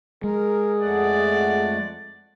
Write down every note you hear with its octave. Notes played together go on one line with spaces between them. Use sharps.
G#3 G#4 A#4
F2 A3 D5 F#5